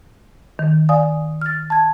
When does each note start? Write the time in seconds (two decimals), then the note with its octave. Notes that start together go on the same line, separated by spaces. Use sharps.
0.59 D#3
0.89 D5 F5 G#5 D#6
1.42 F6 A6
1.70 A5 G#6